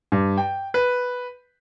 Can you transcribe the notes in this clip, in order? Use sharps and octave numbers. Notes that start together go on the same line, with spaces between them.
G2
G5
B4